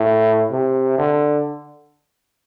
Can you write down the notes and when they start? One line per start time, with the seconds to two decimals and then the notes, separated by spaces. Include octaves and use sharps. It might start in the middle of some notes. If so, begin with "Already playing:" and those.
Already playing: A2
0.52 C3
0.98 D3